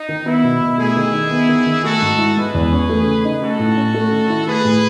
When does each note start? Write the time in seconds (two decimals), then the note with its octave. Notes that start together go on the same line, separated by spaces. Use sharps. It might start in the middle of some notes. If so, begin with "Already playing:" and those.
Already playing: D#4
0.09 D#3
0.26 B3 E4
0.44 B2
0.61 B2
0.78 A3 E4 G#4
0.96 D#3
1.13 D#4
1.31 B3
1.48 D#3
1.66 D#3
1.84 A3 F#4 A4
2.02 G#2
2.19 E4
2.36 G#3 G#4 B4
2.54 E2
2.72 C#4
2.89 A3
3.07 C#3
3.25 D#4
3.42 A3 F#4 A4
3.59 A2
3.77 C#4
3.94 A3
4.12 D#3
4.30 E4
4.47 A3 G#4 B4
4.65 A2